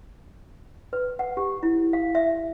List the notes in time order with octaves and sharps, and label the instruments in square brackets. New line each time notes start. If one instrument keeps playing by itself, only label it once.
[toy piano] B4
F#5
G4
E4
F5
E5